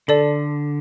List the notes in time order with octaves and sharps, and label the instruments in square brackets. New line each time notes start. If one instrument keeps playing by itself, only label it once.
[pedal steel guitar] D3 [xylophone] A4 D5 A5